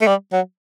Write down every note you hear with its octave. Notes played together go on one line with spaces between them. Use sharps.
A3
G3
F#3